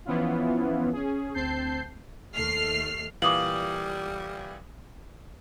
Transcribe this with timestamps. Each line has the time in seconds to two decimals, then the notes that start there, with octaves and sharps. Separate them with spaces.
0.05 E3 F3 B3 C#4 E4 F4
0.93 C#4 G#4
1.34 D2 C4 A5 G6 C7
2.35 D#2 A3 F6 C7
3.22 A#2 E3 G3 F5 D6 D#6 F#7